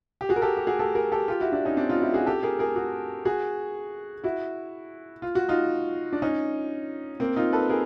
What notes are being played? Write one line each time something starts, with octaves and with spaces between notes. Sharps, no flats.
G4
F#4 G#4
A#4
G4 A4
G4
F#4 G#4
G4 A4
G#4 A#4
G4 A4
F4 G4
E4 F#4
D4 E4
C#4 D#4
C4 D4
D#4 F4
E4 F#4
F#4 G#4
G4 A4
G#4 A#4
G#4 A#4
F#4 G#4
F#4 G#4
E4 F#4
F4
F#4
D#4 F4
D4
C#4 D#4
A#3 C4
D#4 F4
A4 B4
G#4 A#4